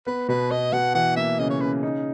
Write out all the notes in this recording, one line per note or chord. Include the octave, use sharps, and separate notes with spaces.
B3 B4
B2 B4
B3 D#5
B2 F#5
E3 F#5
A#3 E5
C#3 D#5
C#5
C#3 B4
D#4